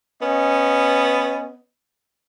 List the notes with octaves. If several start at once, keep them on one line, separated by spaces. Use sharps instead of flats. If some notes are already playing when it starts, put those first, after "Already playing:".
B3 C#4 D#5